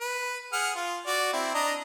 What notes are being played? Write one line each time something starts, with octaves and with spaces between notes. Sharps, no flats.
B4
G#4 F#5 F6
F4
F#4 D5
C4 E4
D4 D#5 A#5